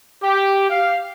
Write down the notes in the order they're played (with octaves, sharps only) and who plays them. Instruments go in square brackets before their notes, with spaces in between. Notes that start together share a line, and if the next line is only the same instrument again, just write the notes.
[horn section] G4
F5